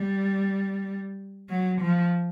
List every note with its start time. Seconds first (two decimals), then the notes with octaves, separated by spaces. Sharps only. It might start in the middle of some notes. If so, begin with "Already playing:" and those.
Already playing: G3
1.50 F#3
1.81 F3